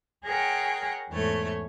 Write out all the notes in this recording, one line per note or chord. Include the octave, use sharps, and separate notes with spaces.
G#4 A#4 C#5 F#5 G5
E2 G#2 A3 C#5